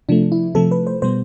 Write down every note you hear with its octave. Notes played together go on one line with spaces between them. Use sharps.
C3 F3 A3 D4
E4
C3 F3 A3 A4
B4
C5
B2 G3 B3 C5